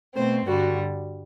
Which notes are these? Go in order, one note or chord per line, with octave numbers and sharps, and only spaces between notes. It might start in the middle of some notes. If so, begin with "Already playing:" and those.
B2 A3 C4 C5
G2 D3 G3 F#4